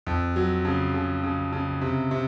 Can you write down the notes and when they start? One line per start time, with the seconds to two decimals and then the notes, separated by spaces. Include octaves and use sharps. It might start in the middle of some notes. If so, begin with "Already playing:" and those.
0.07 F2
0.36 F#3
0.65 C#3
0.94 C#3
1.23 C#3
1.52 C#3
1.81 C3
2.11 C3